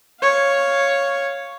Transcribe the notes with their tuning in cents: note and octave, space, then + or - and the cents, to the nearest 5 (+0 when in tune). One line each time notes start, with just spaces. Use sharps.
C#5 +0 F5 +0